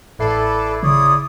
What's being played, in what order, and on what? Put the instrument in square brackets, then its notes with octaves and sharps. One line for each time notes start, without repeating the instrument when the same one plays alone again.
[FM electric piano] A1 E5 C7 [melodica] E4 B4 D5 [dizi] A4
[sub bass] C#3 [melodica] E4 C#5 D5 [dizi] D#6